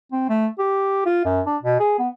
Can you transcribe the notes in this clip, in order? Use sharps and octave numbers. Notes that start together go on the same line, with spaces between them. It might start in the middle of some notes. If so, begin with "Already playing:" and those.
C4
A3
G4
F4
F#2
D4
B2
G#4
B3